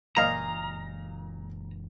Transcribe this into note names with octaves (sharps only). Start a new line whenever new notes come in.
F#1 A#2 E3 A#3 D#5 F5 A#5